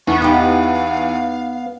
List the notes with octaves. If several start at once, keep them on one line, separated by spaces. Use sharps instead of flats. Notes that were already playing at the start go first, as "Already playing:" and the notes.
E2 B3 C#6
D#4 G4 F5